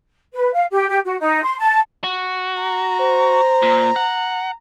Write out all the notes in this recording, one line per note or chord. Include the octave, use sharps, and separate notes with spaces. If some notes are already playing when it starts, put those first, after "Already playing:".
B4
F5
G4
G4
F#4
D#4
C6
A5
F#4
A#5
C5
A#2
F#5